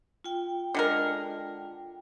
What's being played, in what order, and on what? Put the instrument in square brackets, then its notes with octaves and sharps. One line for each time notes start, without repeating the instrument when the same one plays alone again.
[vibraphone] F4 G5
[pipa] D3 G#3 A#4